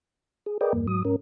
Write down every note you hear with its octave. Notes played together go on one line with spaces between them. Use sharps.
G#4
G#4 A#4 B4 D5 D#5 G5
E2 G2 A#3
G#2 F#3 D#6
G#2 C#4 A#4